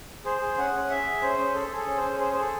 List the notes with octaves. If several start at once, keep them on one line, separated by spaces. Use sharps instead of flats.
G#4 C5
G#4
C#4 F#5
C#4
G#4 E5
G#4
C#4 C5
C#4
G#4 A4
G#4
A4
C#4
C5
C#4
G#4 C5
G#4 C5
A4